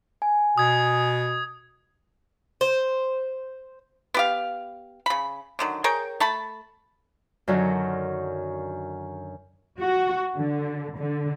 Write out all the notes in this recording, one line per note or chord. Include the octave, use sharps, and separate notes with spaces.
G#5
B2 D#6 G#6
C5
B3 G4 F5
C#3 B5
D3 D#3 F#3
G#4 A#4 C#5 G5
A3 A5 B5
F#2 D3 D#3 F#3
F#4
D3
D3